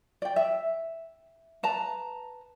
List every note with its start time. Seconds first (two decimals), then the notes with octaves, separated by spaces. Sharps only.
0.22 D5 G5
0.36 E5
1.63 B4 A5 A#5